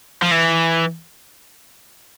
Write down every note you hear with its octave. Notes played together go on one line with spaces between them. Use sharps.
F3
E3